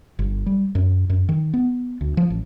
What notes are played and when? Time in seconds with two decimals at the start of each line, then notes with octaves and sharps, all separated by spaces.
0.19 G1
0.46 G3
0.75 F#2
1.10 F#2
1.29 D#3
1.54 B3
2.01 D2
2.17 F3
2.30 A1